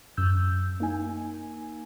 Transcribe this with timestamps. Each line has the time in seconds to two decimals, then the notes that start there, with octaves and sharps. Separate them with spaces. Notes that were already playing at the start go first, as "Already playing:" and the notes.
0.17 F#2 E6 G6
0.80 A#3 D#4 G#5